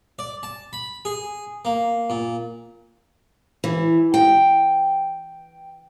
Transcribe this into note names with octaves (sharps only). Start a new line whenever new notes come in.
D5
A5
B5
G#4
A#3
A#2
E3
G5